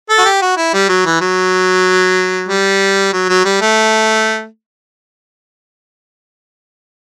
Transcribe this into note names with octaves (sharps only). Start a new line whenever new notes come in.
A4
F#4
G4
F#4
E4
G3
F#3
E3
F#3
G3
F#3
F#3
G3
A3